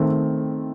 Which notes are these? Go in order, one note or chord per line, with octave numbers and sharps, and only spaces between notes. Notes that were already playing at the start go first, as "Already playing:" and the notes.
Already playing: D#3 A3 C4